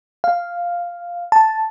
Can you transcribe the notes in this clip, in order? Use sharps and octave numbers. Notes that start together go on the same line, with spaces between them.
F5
A5